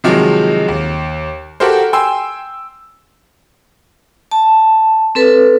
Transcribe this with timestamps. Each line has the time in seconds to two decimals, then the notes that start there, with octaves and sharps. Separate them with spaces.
0.04 C3 D#3 F3 F#3 G#3
0.68 D#2
1.60 F#4 G4 A4 A#4 C5
1.93 G5 G#5 C6 E6
4.31 A5
5.15 C4 A4 B4